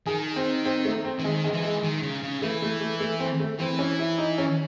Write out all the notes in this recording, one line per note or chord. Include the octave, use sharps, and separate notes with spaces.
D#3 G#4
C4
C4
A3
C4
E3
D#3 G#3
G#3
E3
G#3
D#3
C#3
C#3
E3 A3
A3
A3
A3
C4
A3
E3 C4
C#4
E4
D#4
C#4